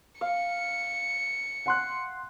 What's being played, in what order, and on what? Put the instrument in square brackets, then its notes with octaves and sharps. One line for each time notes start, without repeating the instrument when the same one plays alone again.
[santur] F5 [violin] C#7
[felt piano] F#5 C6 F#6